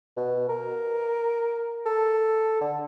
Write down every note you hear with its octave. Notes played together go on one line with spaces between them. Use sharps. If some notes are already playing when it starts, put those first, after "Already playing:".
B2
A#4
A4
D3